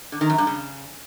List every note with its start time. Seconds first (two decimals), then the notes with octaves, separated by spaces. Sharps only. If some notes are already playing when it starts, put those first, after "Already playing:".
0.12 D3
0.21 D#3
0.30 F#2
0.38 G2
0.47 C#3